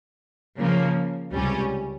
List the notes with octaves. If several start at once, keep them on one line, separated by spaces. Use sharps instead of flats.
C#3 F3 A#3
C#2 C3 G3 C#4